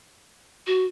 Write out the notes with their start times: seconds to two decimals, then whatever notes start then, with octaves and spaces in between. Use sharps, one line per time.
0.67 F#4